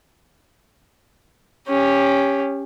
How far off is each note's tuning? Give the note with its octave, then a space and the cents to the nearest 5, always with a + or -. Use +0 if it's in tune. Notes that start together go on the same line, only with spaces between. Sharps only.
C#4 +0 G4 +20